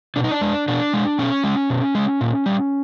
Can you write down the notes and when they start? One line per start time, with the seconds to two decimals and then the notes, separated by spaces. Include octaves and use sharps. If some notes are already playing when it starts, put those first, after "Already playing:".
0.16 B2 D4
0.24 D#4
0.31 D4
0.41 G#3
0.68 B2 D4
0.93 G#3
1.19 B2 C#4
1.44 G#3
1.70 B2
1.95 G#3
2.21 A#2
2.46 G3